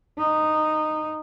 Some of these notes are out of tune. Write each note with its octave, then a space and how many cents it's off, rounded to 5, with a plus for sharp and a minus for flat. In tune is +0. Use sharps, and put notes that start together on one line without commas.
D#4 -10